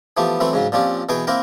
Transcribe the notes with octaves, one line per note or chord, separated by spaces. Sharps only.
E3 F3 A3 B3 G4
E3 F#3 A3 C4 B4
G#2 C#3 F#3
A#2 F3 C4 C#4 G4
B2 E3 G#4 B4 G5 G#5
A#3 C4 E4 A#4 G5